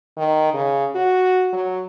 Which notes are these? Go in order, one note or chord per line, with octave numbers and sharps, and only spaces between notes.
D#3
C#3
F#4
F#3